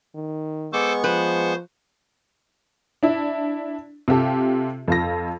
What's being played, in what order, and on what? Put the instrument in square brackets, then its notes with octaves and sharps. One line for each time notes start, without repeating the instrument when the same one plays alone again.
[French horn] D#3
[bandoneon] G#3 B3 C#6 [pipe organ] A4 C5 D6
[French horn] F3 [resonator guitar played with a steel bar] B4 [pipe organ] C5
[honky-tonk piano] D4 E4
C3 F4 G4 A4
F2 F4 A#6